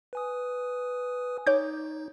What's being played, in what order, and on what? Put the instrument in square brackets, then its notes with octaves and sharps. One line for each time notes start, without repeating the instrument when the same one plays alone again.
[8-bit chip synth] B4 G#5 D#6
[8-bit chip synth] D#4 [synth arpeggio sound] C#5 D6 G6